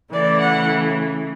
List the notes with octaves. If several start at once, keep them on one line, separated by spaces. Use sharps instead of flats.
C#3 E3 A3 D5
F#5